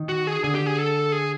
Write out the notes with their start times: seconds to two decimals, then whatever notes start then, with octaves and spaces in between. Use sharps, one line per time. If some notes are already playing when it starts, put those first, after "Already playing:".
Already playing: D#3
0.09 F#4
0.27 G#4
0.44 D3 G#4
0.55 G4
0.66 G#4
0.78 A4
1.12 G#4